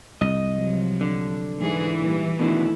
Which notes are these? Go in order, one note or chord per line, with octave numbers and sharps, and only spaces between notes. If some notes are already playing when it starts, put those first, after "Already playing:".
C2 D#5
C3 F3 F#3
D3
G#2 E3 G#4
A#2 G3
B2 D3 D#3 A3 E4